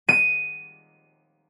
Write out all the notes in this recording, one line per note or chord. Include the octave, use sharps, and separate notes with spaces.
D#7